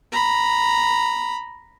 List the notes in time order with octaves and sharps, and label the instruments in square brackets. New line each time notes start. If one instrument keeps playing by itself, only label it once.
[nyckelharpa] A#5 B5